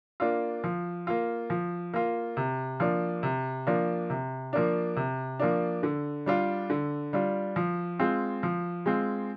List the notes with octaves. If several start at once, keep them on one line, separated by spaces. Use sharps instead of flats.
A#3 D4 F4
F3
A#3 F4
F3
A#3 F4
C3
F3 A#3 D4
C3
F3 A#3 D4
C3
F3 A#3 D4
C3
F3 A#3 D4
D3
G3 D4 F4
D3
G3 D4 F4
F3
G#3 C4 F4
F3
G#3 C4 F4